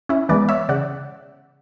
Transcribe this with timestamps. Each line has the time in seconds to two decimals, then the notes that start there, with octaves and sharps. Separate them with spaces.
0.09 C#4 E4
0.29 E3 G#3 B3 B4 D5
0.49 C#5 E5
0.69 C#3 D5 F#5